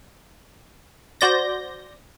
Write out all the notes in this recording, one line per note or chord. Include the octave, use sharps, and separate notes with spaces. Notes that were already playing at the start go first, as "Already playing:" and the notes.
F#4 C5 D5 G6 A#6